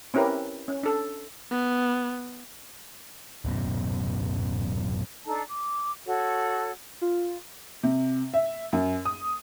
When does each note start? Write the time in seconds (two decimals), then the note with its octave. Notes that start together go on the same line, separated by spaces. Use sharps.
0.14 C4 C#4 E4 G4 A#4 B4
0.68 C#4
0.83 D4 A4
1.51 B3
3.45 D1 F#2 B2
5.26 D4 D#4 A4 A5
5.49 D6
6.07 F#4 A4 C#5
7.01 F4
7.83 C3
8.34 E5
8.73 F#2
9.05 D#6